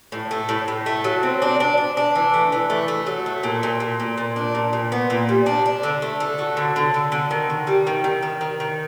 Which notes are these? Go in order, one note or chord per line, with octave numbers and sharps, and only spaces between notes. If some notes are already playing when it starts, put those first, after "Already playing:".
A2
A3
A2
A2
A3
F#3
C4
D4
D4
D4
D4
E3
A3
E3
A3
A3
F#3
A3
A#2
A#2
A#2
A#2
A#2
D4
A#2
A#2
B3
A#2
G3
D4
D4
D3
A3
A3
F#3
D3
D3
D3
D3
D#3
D#3
G3
D#3
D#3
D#3
D#3
D#3